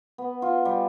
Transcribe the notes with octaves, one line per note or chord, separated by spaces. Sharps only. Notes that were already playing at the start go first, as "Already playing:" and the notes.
B3
F4
G3